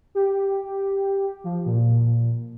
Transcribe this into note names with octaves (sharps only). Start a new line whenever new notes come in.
G4
F3
A#2